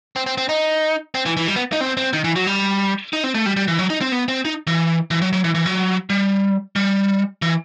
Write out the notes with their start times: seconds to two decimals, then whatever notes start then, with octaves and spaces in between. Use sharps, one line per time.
0.16 C4
0.26 C4
0.38 C4
0.49 D#4
1.15 C4
1.26 E3
1.37 E3
1.48 G3
1.56 B3
1.73 D#4
1.81 C4
1.97 C4
2.13 D#3
2.24 E3
2.36 F#3
2.47 G3
3.13 D#4
3.24 C4
3.34 A3
3.46 G3
3.57 G3
3.68 E3
3.79 F#3
3.90 D#4
4.01 C4
4.12 B3
4.28 C4
4.45 D#4
4.67 E3
5.11 E3
5.22 F#3
5.33 F#3
5.44 E3
5.55 E3
5.66 F#3
6.10 G3
6.76 G3
7.42 E3